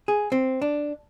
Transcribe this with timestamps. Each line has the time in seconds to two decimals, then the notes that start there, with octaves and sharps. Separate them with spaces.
0.08 G#4
0.32 C4
0.62 D4